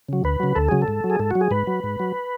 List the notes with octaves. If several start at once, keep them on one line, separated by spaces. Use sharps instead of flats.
C#3 F#3
D2 B4
C#3 F#3
D2 A4
C#3 F#3 G#4
A4
G#2
F#3
G#4
G#2 A4
F#3 F#4
G#4
G#2 B4
F#3
G#2
F#3